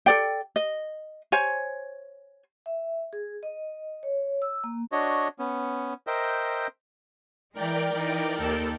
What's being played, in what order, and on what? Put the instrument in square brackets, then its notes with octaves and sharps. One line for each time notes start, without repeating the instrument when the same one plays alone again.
[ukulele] A4 D5 G5
D#5
C5 C#5 G#5
[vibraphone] E5
G#4
D#5
C#5
E6
A#3
[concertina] D4 F#4 C#5 D#5
B3 C#4
A#4 C5 D#5 E5 G5
[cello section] E3 G#3 [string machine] A#4 D5 G5
[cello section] E3 D#4
D#2 A4